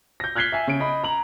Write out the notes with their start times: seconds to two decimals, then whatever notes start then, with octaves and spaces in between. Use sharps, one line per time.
0.20 G6 A#6
0.35 F6 F#6 G#6 B6 C7 G7
0.52 E5 G#5
0.67 C#3 D7
0.80 D#5 B5
1.04 A#5 F#7